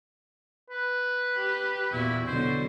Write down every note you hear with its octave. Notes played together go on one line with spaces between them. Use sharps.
B4
G4
E2 A#2 E4 F#4
B2 D3 F#3 C5